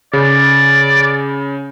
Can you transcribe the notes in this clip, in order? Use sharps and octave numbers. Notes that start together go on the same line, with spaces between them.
C#3 D5